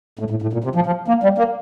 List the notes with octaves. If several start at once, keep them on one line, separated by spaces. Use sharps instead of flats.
A2
A2
A2
A#2
C3
F3
F3
A#3
G3
A#3